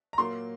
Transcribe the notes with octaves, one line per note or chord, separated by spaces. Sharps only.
A#5
A#2 F#3 A#3 C6